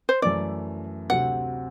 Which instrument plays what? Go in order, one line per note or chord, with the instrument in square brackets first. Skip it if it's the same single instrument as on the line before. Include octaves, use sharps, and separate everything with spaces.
[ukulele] C5
[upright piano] F#2 E3 A3 [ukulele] D5
[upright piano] D2 C3 F#3 C4 [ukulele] F#5